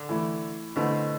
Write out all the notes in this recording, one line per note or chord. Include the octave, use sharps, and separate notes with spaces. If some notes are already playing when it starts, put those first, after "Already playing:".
Already playing: D3
E3 A3 E4
B2 D3 A3 C4 E4